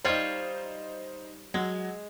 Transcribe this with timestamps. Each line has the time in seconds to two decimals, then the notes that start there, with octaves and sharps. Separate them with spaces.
0.05 G3 D#4 F4 C5 C#5
1.54 F#3 G#3